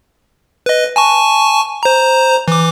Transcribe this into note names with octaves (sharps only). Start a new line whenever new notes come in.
B4 D#5
G#5 A5 C#6
C5 A#5
E3 D6